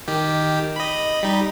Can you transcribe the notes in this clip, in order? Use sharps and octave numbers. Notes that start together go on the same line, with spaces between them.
D#3 G4
D#5 B5
G3 D#4